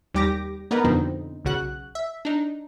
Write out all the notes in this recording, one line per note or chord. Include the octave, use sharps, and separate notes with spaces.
D#2 G3 G4 D6 A#6
A#3 B3 D#4 A#4 B4
F2 B2 D3 C4 D#4
B1 C#3 F#4 F#6
E5
D4 D#4